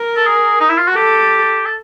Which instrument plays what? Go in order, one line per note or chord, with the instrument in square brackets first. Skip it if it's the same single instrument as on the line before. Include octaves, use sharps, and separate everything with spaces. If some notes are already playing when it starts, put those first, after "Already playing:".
Already playing: [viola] A#4
[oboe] A4
G#4
D#4
E4
F4
F#4
[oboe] G4 [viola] A4
[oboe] A4